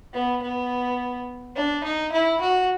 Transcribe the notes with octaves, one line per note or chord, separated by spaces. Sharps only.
B3
B3
D4
D#4
E4
F#4